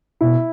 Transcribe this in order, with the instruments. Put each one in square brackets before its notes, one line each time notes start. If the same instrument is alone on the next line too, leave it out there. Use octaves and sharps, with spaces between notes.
[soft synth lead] B2 [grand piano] E4